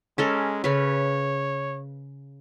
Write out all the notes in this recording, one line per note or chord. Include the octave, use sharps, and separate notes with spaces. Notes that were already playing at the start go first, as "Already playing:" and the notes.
G#3 C#4 A4 A#4
C#3 B4 C#5